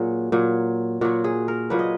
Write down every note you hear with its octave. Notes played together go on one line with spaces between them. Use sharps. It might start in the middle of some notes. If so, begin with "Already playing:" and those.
Already playing: A#2 F#3 F#4 G#4
A#2 F#3
A#2 F#3 F#4
G#4
A#4
A#2 F#3 B4
D#5